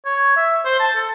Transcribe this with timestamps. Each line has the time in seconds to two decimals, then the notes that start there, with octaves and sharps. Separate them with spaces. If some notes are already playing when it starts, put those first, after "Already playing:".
0.06 C#5
0.37 E5
0.65 C5
0.80 A5
0.95 A4